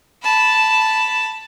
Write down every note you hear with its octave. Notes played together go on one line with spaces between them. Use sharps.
A5 B5